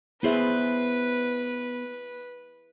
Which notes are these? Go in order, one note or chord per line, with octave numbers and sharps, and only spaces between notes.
B3 E4 G#4 B4 C5 D5 E5